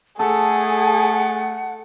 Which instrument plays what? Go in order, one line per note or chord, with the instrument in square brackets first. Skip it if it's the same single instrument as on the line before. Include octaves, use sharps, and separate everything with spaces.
[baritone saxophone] A3 [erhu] G#4 [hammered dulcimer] A4 [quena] F#5